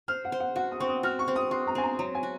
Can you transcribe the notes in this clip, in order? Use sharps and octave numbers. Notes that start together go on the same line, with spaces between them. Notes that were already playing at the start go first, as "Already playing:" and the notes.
C5 F6
F#5
C5
F#5
F#4 F#5
D#6
C4 C#6
D#6
F#4 F6
C#6
C4
D#6
F#4 C6
A#5
C4 G#5
A#5
F#3 A#5
G#5
F#4